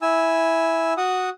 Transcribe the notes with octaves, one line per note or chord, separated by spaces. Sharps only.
E4 G#5 E6
F#4 F#5 D#6